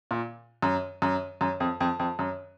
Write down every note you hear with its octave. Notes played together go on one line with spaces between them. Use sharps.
A#2
F#2
F#2
F#2
F2
F2
F2
F#2